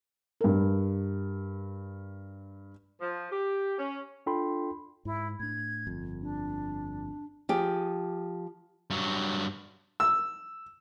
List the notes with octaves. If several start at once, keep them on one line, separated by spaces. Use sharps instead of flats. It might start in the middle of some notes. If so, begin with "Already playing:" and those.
G2 A#4
F3
G4
C#4
D4 F4 A4 G5 B5 C6
G#2 E4
A2 D4 G#6
G1 F2
D4
F3 G4 G#4
G2 F#3
E6